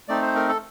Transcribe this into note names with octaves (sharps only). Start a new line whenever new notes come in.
A3 C4 D#4 D5
C5
A#4
A4